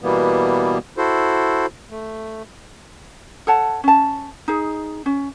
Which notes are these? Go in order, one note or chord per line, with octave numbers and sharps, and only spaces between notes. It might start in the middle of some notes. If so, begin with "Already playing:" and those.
B2 E3 G3 A#3 B3
E4 F#4 A4 C5
A3
A4 C#5 F#5 A5
C#4 A5
D#4 G#4
C#4